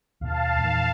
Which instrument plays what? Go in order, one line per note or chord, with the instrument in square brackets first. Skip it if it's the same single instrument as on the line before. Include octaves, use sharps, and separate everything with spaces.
[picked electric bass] D#2 B2 [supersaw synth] F5 A5
[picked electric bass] E2 A#2 D#3